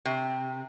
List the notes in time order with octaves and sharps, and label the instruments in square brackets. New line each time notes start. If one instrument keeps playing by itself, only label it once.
[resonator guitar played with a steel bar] C3